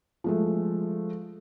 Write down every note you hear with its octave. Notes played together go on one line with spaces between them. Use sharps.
F3 G#3 A3